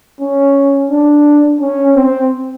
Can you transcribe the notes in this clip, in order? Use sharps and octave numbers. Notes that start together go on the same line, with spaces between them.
C#4
D4
C#4
C4